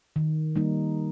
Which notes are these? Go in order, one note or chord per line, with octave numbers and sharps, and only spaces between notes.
D#3
G3 A#3 D#4